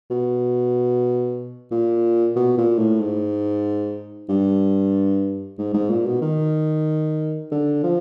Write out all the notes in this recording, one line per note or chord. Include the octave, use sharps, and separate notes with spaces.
B2
A#2
B2
A#2
A2
G#2
G2
G#2
G#2
A#2
B2
D#3
D3
F3